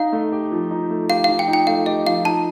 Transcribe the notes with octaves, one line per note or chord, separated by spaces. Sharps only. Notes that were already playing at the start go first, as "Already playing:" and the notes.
Already playing: D#4 F5
A3
G4
F3
D#4
A3
G4 F5
F3 F5
G5
D#4
G5
A3 F5
G4 D#5
F3 F5
D#4 A5